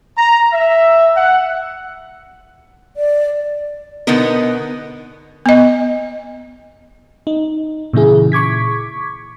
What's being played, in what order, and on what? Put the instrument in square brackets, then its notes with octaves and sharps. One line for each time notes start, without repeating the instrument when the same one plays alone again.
[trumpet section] A#5
E5
F#5
[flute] D5
[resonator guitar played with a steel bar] B2 D3 B3 D#4 A#4
[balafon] B3 D#5
[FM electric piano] D#4
A#2 C#3 E3 E4 G#4
C#6 D6 G#6 B6